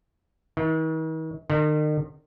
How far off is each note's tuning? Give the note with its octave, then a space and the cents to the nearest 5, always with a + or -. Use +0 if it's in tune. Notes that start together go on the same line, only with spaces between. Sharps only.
D#3 +45
D#3 -40